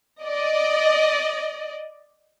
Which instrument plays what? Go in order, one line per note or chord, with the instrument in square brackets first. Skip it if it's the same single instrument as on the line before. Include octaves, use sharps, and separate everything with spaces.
[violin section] D5 D#5